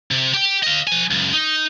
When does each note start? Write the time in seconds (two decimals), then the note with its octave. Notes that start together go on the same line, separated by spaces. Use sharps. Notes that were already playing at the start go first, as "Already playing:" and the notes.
0.11 C3
0.34 G4 G5
0.63 D#5 F5
0.87 F3 G#5
1.11 C#2 F#2
1.33 D#4